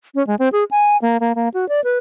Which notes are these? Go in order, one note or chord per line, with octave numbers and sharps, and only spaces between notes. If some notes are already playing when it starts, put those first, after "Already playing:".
C#4
G#3
C4
G#4
G#5
A#3
A#3
A#3
F#4
D5
B4